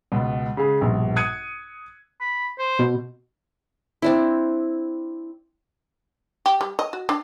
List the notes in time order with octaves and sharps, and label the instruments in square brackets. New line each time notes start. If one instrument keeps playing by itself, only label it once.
[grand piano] C#2 B2
C#3 G#3 G#4
A#1 G2 B2
D#6 F#6 G#6 C#7 D#7
[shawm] B5
C5
[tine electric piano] B2
[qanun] C4 D4 E4
[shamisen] G4
G3
D#5
F#4
D4